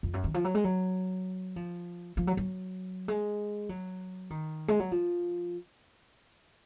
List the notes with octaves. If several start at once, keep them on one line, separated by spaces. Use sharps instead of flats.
F2
F#2
D#3
F3
F#3
G#3
F#3
F3
F3
F#3
F#3
G#3
F#3
D#3
G#3
F#3
F3